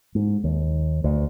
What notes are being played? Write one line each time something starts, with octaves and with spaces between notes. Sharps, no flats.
G#2
D#2
D2